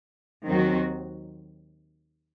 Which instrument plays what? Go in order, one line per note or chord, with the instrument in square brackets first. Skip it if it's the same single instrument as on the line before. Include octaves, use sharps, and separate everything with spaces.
[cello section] D#2 D#3 F#3 C4 F#4